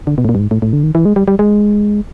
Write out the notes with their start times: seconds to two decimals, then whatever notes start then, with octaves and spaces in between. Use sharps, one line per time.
0.07 D3
0.18 B2
0.25 A2
0.29 A#2
0.35 G2
0.39 G#2
0.51 A2
0.62 A2
0.73 D3
0.83 D#3
0.95 E3
1.05 G#3
1.16 G3
1.28 G3
1.39 G#3